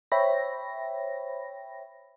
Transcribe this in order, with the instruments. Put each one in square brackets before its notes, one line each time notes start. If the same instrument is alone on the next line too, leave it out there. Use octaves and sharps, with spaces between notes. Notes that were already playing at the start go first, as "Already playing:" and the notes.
[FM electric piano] C5 C#5 E5 G5 B5 A#6